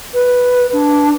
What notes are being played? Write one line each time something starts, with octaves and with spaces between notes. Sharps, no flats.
B4
D4